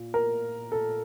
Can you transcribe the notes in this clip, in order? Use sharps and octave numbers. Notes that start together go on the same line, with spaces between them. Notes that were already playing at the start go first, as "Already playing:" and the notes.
Already playing: A#2
A#4
A4